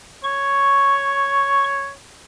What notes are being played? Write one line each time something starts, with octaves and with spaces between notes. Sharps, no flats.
C#5 C#6